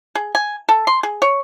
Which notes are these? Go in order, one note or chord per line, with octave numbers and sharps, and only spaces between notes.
G#4
G#5
A4
C6
G#4
C#5